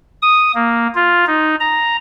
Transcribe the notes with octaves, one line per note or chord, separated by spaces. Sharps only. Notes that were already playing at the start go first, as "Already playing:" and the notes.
D#6
A#3
F4
D#4
A#5